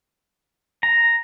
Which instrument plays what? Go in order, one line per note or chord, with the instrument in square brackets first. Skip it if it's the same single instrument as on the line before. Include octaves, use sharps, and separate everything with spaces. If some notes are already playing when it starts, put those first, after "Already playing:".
[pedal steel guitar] A#5